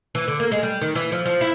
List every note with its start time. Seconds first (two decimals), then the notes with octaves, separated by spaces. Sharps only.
0.15 E3
0.28 D3
0.40 A#3
0.52 G#3
0.63 G3
0.81 D#3
0.95 E3
1.12 F3
1.25 F3
1.41 E4